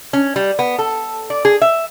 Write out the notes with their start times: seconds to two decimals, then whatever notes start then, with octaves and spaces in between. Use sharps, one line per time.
0.13 C#4
0.36 G3
0.59 B3
0.79 A4
1.30 D5
1.45 G#4
1.62 E5